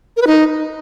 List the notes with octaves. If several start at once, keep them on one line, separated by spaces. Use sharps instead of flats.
A#4
B4
D#4